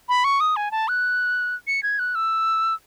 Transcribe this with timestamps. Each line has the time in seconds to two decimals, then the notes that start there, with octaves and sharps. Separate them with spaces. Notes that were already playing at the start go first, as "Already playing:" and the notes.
0.09 B5
0.24 C#6
0.40 D#6
0.56 G#5
0.71 A5
0.88 F#6
1.67 C#7
1.83 G#6
1.99 F#6
2.15 E6